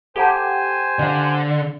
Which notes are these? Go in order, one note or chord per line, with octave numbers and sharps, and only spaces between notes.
G4 A4 C5 F#5 G#5 A5
D3 D5 F5